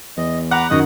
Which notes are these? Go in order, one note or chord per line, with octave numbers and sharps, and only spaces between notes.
E2 D#5
F#5 A#5 B5 D6
F#2 D#3 F#4 D#5 D#6